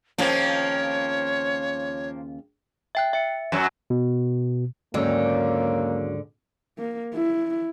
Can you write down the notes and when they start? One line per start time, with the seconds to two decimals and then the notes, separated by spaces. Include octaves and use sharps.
0.18 D#2 C#3 F3 A#3 C4 F4 C#5
2.95 E5 G5 F#6
3.13 E5 C#7
3.52 F#2 F#3
3.90 B2
4.94 D#2 G#2 D3 F#3 A#3 C#4
6.79 A#3
7.14 E4